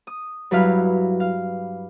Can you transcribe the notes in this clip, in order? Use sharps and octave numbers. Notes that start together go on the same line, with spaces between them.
D#6
G2 F#3 E4 B4 F5
F5